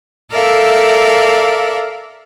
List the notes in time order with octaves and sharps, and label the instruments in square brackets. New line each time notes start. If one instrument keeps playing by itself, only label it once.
[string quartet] A4 A#4 D5 E5 F5